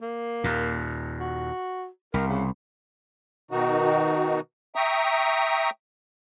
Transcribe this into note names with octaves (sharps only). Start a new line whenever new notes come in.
A#3
D#2 A#2
F#4
C2 A#4
C#3
B2 D#3 D#4 F#4
E5 G5 A#5 C#6 D#6